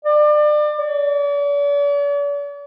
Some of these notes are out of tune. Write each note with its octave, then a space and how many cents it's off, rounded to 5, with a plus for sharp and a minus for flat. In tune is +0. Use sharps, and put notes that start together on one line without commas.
D5 +30
D5 -45